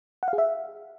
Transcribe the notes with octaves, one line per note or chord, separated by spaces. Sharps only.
F#5
F5
G#4
E5